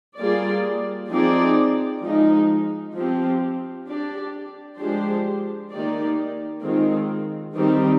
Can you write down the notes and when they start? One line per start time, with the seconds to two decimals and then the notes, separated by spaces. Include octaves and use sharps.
0.18 G3 A#3 F4 G#4 D5
1.11 F3 C4 D#4 G#4 D5
2.03 F3 G#3 D#4
2.95 F3 C4 G4
3.87 D4 G4 D5
4.79 F3 G#3 D4 G4 C5
5.71 D#3 A#3 D#4 G4 D5
6.63 D#3 G#3 C4 F4
7.55 D#3 G3 C4 D#4 G4